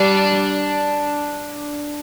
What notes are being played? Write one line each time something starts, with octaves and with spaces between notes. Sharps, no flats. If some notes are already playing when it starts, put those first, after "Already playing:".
Already playing: G3 D4